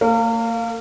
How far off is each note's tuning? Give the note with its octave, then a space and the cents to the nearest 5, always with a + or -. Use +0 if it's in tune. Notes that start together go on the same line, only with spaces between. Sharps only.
A#3 -40 F5 +0